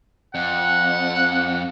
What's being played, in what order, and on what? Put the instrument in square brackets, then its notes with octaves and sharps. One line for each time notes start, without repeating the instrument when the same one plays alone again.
[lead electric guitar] F2 [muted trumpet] F#5